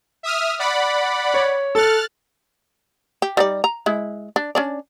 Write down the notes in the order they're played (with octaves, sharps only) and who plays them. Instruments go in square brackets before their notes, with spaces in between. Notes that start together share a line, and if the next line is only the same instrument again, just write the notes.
[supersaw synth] E5 D#6 F6
D5 F#5 B5
[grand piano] C#5
[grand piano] A4 [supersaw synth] F6 F#6 A6
[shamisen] G4
G3 D#4 D5
A#5
G#3 E4
D4
C#4 D4 D5